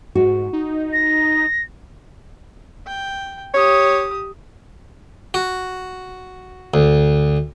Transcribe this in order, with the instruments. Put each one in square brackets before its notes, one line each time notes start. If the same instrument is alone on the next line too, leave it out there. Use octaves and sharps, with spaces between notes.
[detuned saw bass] G#2 [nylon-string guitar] F#4
[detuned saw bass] D#4
[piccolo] A#6
[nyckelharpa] G5
[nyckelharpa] G4 D#6 [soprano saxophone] C#5
[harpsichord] F#4
D2